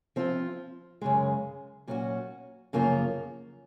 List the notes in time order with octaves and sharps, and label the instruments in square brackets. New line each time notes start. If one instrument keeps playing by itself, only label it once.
[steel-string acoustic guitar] F3 C4 F4
F#2 C#3 G#3
A#2 F#3 C#4 F#4
F#2 C#3 F3 A#3 F4